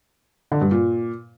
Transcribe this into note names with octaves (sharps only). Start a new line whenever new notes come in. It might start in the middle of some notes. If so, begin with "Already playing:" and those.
D3
G2
A#2